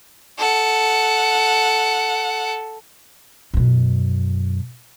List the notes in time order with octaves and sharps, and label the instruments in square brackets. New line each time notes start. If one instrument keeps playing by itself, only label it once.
[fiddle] A4 F#5
[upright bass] F#2 B2